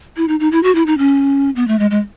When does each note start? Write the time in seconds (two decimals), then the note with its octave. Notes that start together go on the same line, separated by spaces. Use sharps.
0.17 E4
0.28 D#4
0.40 D#4
0.52 E4
0.63 F#4
0.75 E4
0.86 D#4
0.98 C#4
1.56 B3
1.68 A3
1.79 G#3
1.91 G#3